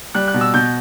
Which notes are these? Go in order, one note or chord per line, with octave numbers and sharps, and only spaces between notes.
G3 F#6
F#6
B2
E6
B2 G6